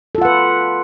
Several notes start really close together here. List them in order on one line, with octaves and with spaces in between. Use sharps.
A4 F4 F#5 B4